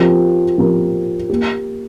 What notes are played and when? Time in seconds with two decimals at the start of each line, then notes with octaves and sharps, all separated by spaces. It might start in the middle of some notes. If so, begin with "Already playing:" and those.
Already playing: F3 C4 G4 A#4
0.58 F3 C4 G4 A#4
1.30 A#3 G4